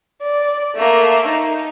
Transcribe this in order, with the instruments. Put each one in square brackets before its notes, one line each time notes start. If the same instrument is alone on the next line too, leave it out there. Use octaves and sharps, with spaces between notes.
[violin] D5
A3 A#3
D#4